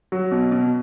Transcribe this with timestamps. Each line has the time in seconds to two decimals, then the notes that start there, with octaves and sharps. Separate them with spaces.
0.12 F#3
0.32 B2
0.52 B2